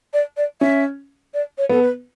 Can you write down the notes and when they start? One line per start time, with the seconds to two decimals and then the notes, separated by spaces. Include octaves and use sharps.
0.13 D5
0.37 D5
0.61 C#4 E5
1.34 D5
1.58 C#5
1.69 B3 A4
1.82 B4